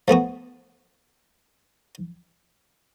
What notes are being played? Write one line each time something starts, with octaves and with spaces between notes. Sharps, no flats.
F3 A3 B3 F#4